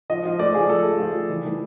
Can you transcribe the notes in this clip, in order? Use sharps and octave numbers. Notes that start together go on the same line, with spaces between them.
F3 D#5
F3
A3 D5
F3 G#4
F3 A4
A3
F3 G4
F3
E3
E3